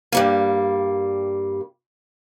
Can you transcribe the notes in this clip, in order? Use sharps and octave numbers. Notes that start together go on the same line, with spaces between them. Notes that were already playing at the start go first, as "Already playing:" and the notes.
G2 G3 A#3